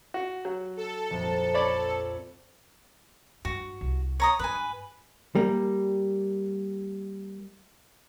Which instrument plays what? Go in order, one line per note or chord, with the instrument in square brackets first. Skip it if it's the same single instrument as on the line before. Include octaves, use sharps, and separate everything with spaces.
[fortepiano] F#4
F#3
[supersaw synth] A4
[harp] A#1 F2
[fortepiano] C#5 D5 B5
[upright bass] G2 [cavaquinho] F#4
[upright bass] C2
[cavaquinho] C#5 A#5 D#6
[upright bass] G2 [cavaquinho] B4 G#5
[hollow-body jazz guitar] G3 A#3